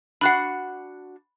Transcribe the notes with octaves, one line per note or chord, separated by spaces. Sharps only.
D4 F#4 F#5 B5 F#6 C7